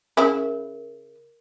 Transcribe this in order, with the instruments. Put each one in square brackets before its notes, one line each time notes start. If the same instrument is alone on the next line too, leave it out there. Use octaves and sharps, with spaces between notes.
[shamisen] C#3 E4 [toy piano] A#4